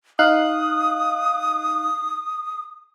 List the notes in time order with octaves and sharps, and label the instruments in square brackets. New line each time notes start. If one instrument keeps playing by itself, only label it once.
[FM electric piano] D#4 F5 F#6 [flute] D#6